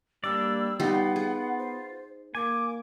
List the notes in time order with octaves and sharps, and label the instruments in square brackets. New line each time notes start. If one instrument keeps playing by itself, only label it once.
[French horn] G3 [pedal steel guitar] A#3 D4 D5 [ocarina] E6
[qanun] G3 D#4 [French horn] B3 [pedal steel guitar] F4 [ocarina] F#5
[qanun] G#4
[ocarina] C5
[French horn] A#3 [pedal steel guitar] G#5 [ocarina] D6